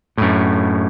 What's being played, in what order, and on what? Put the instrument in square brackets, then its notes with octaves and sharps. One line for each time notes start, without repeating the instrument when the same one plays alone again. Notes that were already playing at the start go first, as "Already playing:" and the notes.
[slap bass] F#2 A2